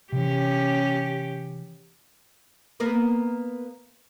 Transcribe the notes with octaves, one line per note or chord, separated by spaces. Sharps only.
C3 E3 C#4 G4
A#3 B3 A#4